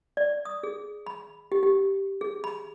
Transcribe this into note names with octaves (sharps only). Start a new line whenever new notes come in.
D5
D#6
G#4
B5
G4
G4
G#4
B5